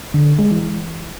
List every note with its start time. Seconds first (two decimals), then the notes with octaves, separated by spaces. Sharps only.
0.14 D3
0.39 G#3
0.51 E3